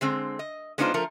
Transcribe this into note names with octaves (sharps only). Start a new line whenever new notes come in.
D3 G#3 C4
D#5
G#3 B3 D4 D#4 F4 C5
F3 A3 A#4